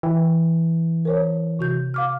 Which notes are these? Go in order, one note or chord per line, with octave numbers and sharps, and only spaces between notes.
E3 G5
A#4 C5 C#5
C3 F#4 G6
F5 D6 F6